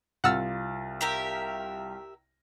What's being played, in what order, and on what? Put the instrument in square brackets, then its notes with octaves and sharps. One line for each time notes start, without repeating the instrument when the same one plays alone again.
[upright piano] C2 F4 A6 [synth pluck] F#5 E6 F6
[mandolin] G4 A#4 E5